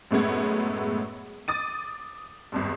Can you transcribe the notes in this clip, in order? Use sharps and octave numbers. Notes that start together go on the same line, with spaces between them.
F#2 A2 G#3 B3 G#6
D6 D#6 A6 D#7
G#1 E2 G2